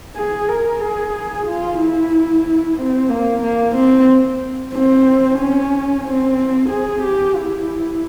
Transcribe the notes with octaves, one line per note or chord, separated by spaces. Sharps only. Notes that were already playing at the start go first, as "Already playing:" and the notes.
G#4
A#4
G#4
F4
E4
C4
A#3
A#3
C4
C4
C#4
C4
G#4
G4
E4